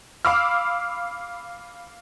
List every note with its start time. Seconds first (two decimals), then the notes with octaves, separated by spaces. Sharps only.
0.25 F5 B5 D6 E6 F6